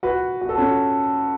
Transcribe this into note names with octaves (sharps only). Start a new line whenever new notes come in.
F#4 B4
F#4
A4
C#4 F#4